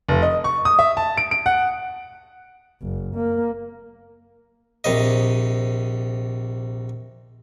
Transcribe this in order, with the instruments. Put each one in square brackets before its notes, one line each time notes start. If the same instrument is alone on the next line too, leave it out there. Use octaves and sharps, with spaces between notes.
[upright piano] F1
D#5
C#6
D#6
E5
A5
D7
D7
F#5
[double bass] F#1
A#3
[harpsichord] A#1 C3 D#5